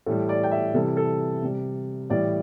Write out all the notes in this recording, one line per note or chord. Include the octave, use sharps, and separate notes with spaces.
A2 E3 G3 A4
D5
G5
E5
C3 E3 G3 A4
A4
C3 G3
A2 E3 G3 D5